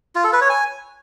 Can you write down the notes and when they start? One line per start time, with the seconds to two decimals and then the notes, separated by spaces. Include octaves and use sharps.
0.15 F4
0.24 A4
0.33 B4
0.41 C#5
0.50 G#5